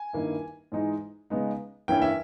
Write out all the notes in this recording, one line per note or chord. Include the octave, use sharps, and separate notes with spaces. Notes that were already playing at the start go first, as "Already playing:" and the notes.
Already playing: G#5
G2 D#3 A#3 E4
G#2 E3 G#3 D#4
C#3 G#3 B3 D#4
G2 E3 A#3 C#4 E4 G5
E5